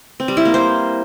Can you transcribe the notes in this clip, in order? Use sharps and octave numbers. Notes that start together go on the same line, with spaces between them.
C4
G3
E4
A#3
C5